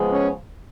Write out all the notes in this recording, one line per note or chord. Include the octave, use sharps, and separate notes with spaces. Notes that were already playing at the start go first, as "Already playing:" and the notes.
Already playing: C#3 F3 G#3 B3
C#4